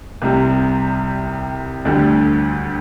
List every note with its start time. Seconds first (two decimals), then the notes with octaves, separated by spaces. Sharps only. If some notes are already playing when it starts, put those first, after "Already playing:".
0.22 C2 C3 G3
1.85 D2 D3 G3